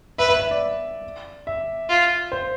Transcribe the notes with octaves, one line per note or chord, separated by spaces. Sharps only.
B4 E5
E5
E5
D5
E5
F4
C5